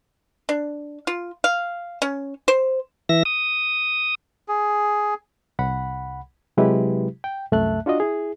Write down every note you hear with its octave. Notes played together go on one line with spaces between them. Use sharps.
D4
F4
F5
C#4
C5
E3 E5 A#6
D#6
G#4
C2 F#5 B5
C3 F#3 G#3 E4 G4 B4
G5
C2 F#2 A3 E5 A5 F#6
D4 F4 F#4 D#5
E4 G#4